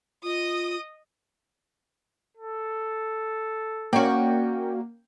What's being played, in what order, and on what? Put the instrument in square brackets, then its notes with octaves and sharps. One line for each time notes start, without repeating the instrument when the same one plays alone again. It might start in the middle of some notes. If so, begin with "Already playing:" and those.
[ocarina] F4 [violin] D#5 D#6
[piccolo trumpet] A4
[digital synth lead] A#3 [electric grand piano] C#4 G5 [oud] F#4 D5